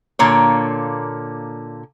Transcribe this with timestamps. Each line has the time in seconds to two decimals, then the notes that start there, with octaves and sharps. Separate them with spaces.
0.19 A#2 D3 A#3 C#5